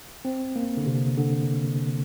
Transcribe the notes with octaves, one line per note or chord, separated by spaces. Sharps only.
C4
A#3
D3
C3
D3